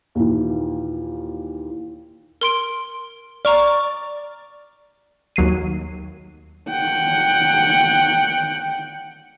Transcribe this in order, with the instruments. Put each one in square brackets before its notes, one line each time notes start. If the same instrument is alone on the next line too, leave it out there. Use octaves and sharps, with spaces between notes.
[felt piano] D#2 A#2 E3
[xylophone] A#4 C6 D7
[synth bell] D5 [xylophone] A#5 C#6 F6
[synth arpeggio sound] D#2 F#3 C7 D#7
[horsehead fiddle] F#5 G5